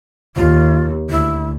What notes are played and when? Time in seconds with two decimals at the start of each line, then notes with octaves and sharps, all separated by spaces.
0.36 D#2 F4
1.10 D2 E4